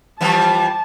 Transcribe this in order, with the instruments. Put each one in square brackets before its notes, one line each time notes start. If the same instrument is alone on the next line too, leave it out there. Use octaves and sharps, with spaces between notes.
[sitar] E3 F3 G3 [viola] A5